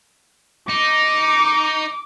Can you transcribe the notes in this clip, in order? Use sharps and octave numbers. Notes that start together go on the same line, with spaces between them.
D#4 D6